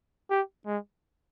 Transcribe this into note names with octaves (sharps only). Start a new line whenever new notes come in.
G4
G#3